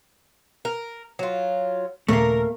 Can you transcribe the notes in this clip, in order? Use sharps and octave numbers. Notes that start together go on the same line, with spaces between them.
A#4
F#3 F4
D#1 A#2 C#3 A3 A#3 A#4